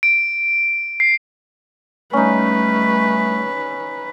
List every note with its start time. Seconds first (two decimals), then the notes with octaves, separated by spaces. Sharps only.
0.03 D7
1.00 C7
2.13 G3 A3 C#4 D#4 B4